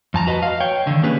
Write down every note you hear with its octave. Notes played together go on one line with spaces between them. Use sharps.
F2 A5 A#5
F#4 B4 D#5
F5
C#5 G5
D3 D#3
A#3 C#4 D4 G4 G#4 B4